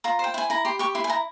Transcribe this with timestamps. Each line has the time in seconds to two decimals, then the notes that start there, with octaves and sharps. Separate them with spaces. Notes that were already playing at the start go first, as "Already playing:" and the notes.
0.04 F4 A#5
0.19 C5 G5
0.34 E4 G#5
0.50 E4 A#5
0.65 G4 C6
0.79 G4 C#6
0.95 E4 C6
1.04 G#5
1.10 E4 A#5